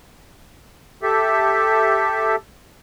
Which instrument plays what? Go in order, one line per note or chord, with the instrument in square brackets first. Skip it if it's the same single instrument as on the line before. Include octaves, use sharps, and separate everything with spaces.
[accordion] G4 A4 E5